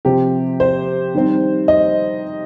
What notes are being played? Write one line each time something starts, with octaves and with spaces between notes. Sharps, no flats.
C3 F3 C4 G4
C5
D#3 G3 C4
D#5